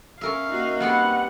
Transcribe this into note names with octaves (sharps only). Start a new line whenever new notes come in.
C#4 A#4 E5 F5
A#3 D#4 F#4
G3 B3 C4 F#5